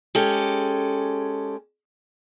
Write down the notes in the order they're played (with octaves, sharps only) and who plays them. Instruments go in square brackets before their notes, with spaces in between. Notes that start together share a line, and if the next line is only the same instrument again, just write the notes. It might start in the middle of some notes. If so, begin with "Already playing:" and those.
[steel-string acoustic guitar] G#3 C#4 G4 A4